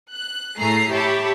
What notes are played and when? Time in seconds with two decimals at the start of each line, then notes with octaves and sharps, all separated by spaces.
0.13 F#6
0.58 A2 A3 G#4 A#5 C7
0.91 G4 C#5 E5 A5 B5